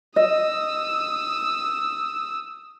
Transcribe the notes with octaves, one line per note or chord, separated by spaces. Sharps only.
D#5 D#6 E6